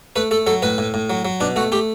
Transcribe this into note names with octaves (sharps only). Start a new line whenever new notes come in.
A3 B4
A3 A4
F#3 A4
A2 B4
A2
A2
F#3
F#3
B2 D4
A3 F#4
A3 G4